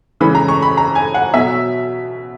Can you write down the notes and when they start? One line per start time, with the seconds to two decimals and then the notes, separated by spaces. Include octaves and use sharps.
0.20 C#3 E3 G#3 B5
0.35 A#5
0.48 C#6
0.62 B5
0.77 A#5
0.95 G#5
1.14 F#5
1.34 B2 F#3 E5